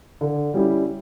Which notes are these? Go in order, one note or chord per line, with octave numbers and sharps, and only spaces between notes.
D3
G3 C#4 E4 G4